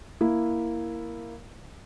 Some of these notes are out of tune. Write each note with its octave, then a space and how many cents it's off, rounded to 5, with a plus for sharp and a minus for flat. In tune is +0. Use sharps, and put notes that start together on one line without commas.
A#3 +0 E4 +0